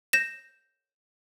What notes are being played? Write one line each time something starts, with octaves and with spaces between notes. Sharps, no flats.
G6 A#6 E7